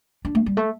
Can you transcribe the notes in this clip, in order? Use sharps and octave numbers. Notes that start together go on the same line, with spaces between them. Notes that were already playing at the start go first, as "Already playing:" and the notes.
D4
A3
G3
A3